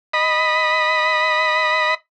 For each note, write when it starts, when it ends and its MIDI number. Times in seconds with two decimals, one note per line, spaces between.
0.13 1.94 75
0.13 1.94 83